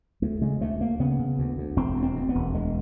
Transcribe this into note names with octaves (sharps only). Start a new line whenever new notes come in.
D2 A3
C#3 G#3
D2 A3
D2 A#3
C#3 B3
C#3
D2
D2
E1 C4
D2
C4
D2
B3
E1
D2 G#3